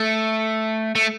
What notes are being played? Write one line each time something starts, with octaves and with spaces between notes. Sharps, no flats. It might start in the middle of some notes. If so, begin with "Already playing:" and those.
Already playing: A3
A3